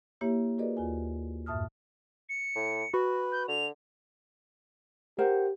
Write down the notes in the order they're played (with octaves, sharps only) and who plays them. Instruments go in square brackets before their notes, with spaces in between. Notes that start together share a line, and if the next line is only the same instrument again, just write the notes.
[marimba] A#3 E4 G4 C#5 E5
F#4 G#4 A#4 B4 D5 D#5
D#2 F4 G#5
F#2 A2 E5 A5 D#6 F6
[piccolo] C#7
[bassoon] A2
[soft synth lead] F#4 [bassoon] B4
[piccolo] G6
[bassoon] D3 [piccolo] F7
[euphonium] G4 [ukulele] A#4 C5 F#5